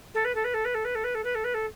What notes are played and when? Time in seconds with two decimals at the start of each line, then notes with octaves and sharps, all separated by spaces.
0.14 A4
0.24 B4
0.34 A4
0.44 B4
0.53 A4
0.64 B4
0.74 A4
0.84 B4
0.95 A4
1.04 B4
1.14 A4
1.23 B4
1.34 A4
1.44 B4
1.54 A4